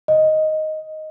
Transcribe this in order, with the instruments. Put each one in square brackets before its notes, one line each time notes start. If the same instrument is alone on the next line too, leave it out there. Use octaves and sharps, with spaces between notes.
[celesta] D#5